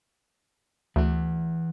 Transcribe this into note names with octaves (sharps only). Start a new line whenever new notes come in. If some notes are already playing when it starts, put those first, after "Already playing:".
D2 E3 F#5